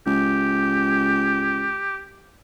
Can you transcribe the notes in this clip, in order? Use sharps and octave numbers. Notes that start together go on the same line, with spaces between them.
C#2 G4